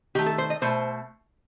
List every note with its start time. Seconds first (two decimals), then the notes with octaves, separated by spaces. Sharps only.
0.15 D#3 G4
0.19 A3
0.26 A4
0.38 C5
0.50 D#5
0.61 B2 A3 C5